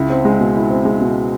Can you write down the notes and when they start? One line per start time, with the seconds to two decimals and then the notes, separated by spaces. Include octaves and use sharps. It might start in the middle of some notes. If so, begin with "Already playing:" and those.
Already playing: C#2 E4
0.10 C4
0.25 G#3
0.40 B2
0.55 E4
0.70 C4
0.85 G#3
1.01 B2